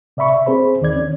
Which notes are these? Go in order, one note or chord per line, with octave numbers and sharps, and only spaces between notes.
C3 D5 E5 B5 C#6
E5
C4 G#4 C5 B5
D#2 D#3 E3 D5 G#6
C#4